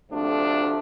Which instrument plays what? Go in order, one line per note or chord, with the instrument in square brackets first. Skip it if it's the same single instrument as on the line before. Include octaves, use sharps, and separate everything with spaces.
[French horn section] D2 C3 F3 A3 D4